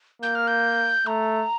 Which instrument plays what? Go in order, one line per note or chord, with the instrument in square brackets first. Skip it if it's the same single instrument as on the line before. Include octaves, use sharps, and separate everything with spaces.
[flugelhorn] A#3 [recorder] G6
[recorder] F6
G6
[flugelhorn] A3 [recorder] A#5